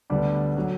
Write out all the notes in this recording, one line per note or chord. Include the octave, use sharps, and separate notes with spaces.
D2 D3 G3 B3 D4 D5
D3 F#3